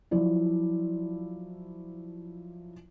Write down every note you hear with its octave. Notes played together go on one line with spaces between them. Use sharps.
F3 F#3 E4 D5